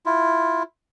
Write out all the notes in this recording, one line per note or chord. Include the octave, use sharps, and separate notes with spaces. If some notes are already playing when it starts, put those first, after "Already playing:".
E4 F4